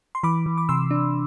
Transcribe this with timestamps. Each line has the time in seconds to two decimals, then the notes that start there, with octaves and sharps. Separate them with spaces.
0.15 C6
0.23 E3 B5 D6
0.46 E3
0.58 D6
0.69 C3 C6 E6
0.91 D4